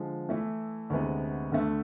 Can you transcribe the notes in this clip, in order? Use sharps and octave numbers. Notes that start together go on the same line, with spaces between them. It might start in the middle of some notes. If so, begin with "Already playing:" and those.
Already playing: D3 F3 G#3
E3 A3 E4
D2 C3 G#3 B3
D2 D3 A3